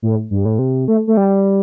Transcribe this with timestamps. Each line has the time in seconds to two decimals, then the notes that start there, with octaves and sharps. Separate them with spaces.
0.02 A2
0.31 G2
0.45 A2
0.59 C3
0.88 A3
1.07 A3
1.17 G3